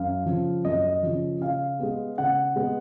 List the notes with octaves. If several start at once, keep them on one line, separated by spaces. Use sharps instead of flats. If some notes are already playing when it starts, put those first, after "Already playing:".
Already playing: F#2 F5
C#3 F3
F#2 D#5
D#5
C#3 F3
C#3 F5
G#3 B3
C#3 F#5
G#3 B3